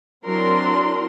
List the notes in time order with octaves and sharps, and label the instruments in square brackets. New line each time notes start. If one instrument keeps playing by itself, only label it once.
[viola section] F#3 C4 D4 E4 A#4 C6